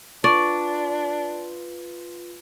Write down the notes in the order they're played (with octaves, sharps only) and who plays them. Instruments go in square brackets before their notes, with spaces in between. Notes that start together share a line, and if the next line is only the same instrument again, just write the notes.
[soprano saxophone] D4 [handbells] F4 B4 [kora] D5 [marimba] C#6